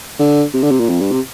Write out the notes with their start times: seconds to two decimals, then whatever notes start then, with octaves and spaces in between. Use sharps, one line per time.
0.19 D3
0.54 C3
0.63 D3
0.71 C3
0.80 A#2
0.89 F2
1.00 G2
1.12 C3